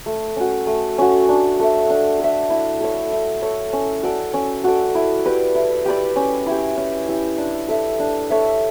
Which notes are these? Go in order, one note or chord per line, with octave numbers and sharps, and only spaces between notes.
A3
C#4 F#4
A3
C#4 F#4
D4
A4 E5
D4
A4 E5
E4
A4 C#5
E4
A4 C#5
C#4
F#4 A4 D5
C#4
F#4 A4 D5
E4
G4 B4 D5
E4
G4 B4 D5
C#4
E4 G4
C#4
E4 G4
D4
A4 C#5 E5
D4
A4 C#5 E5